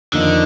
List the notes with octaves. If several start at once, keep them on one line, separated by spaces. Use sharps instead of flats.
F2 D3 D#3 A#3 D#4